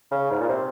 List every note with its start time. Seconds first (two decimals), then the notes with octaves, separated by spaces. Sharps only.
0.11 C#3
0.30 G#2
0.40 A#2
0.49 C3